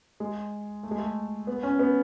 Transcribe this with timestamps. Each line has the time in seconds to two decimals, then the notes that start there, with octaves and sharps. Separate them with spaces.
0.20 G#3
0.83 A3
0.91 G#3
0.99 A3
1.47 B3
1.63 C#4
1.79 B3